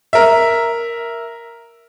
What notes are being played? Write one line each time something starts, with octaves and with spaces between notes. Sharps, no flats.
A#4 E5